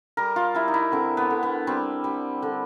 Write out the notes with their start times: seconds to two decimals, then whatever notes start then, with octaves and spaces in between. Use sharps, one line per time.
0.17 G3 A#4
0.36 F4
0.54 G3 E4
0.68 D#4
0.74 E4
0.92 D3 C4
1.17 B3
1.30 D3
1.43 B3
1.67 G3 C4
2.04 G3
2.42 D3